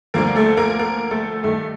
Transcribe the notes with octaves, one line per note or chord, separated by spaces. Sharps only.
D2 D3 F3 A#3 A#4
A3 A4
A#3 A#4
A#3 A#4
A3 A4
G2 D#3 A3 A4